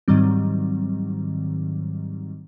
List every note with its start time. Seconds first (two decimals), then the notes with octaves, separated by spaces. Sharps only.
0.08 G#2 D#3 F#3 G3 C4